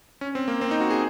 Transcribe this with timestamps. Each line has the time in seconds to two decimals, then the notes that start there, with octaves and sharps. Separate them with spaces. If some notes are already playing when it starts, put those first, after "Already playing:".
0.21 C#4
0.35 C4
0.48 A#3
0.61 C4
0.71 D#4
0.81 F#4
0.90 G#4